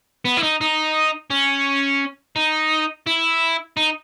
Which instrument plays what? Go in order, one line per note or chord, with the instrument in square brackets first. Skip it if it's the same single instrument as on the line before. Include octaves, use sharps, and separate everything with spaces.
[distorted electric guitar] B3
E4
D#4
D#4
C#4
D#4
E4
D#4